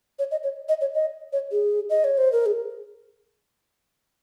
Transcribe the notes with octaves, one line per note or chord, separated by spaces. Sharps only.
C#5
D#5
C#5
D#5
C#5
D#5
C#5
G#4
D#5
C#5
C5
A#4
G#4